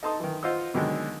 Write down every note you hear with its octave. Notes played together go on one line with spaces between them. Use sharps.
D#4 A4 A5 C6 D#6
D#3 E3
F4 C5 D#5 F#5 E6
B2 D3 D#3 F#3 G#3